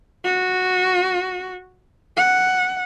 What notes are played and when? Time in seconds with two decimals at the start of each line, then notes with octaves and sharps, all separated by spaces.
0.25 F#4
2.17 F#5